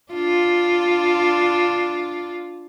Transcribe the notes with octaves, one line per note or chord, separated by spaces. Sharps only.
D4 F4